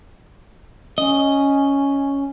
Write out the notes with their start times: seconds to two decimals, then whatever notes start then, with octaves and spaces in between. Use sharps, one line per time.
0.98 C#4 D#5